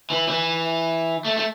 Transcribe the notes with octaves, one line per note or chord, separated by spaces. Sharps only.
E3
E3
A3
A3